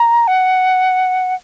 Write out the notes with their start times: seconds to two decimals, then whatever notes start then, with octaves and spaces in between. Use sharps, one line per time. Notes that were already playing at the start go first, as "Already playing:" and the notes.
Already playing: A#5
0.28 F#5